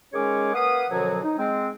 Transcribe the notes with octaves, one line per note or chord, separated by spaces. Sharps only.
D#3 G#3 C#4 G#4 C#5 D6
A#3 B4 F5 F#5 D#6
F#2 B2 D3 F3 F#3
D#4
G#3 C4